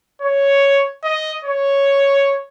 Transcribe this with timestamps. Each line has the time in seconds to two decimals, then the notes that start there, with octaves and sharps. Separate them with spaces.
0.21 C#5
1.04 D#5
1.45 C#5